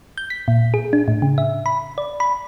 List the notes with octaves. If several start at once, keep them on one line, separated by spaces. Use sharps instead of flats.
G6
B6
A#2
G#4
D4
A2
C#3
E5
B5
D5
B5